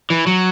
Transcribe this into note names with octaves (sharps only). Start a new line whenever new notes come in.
E3
F#3